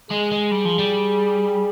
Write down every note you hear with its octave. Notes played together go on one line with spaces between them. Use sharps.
G#3 G#4
G#3
G3
F3
G3